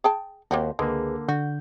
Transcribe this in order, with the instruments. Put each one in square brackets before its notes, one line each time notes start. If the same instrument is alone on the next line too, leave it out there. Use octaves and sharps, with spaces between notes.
[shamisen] G#4 G5 A5
[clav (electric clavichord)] D#2 [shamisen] A#3 C4 F#4
[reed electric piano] C#2 G#4 B4 [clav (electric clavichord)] D3 A#3 [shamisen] G#3
[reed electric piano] D3 G6 [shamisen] F#4